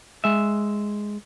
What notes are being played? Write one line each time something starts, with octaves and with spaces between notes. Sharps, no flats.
G#3 E5